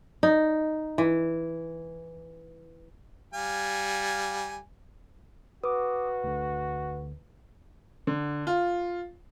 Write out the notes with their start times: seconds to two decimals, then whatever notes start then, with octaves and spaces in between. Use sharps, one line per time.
0.23 D#4
0.98 E3
3.34 G3 F5 G#5
5.64 F#4 B4 D6 D#6
6.24 D2 D3
8.07 D3
8.47 F4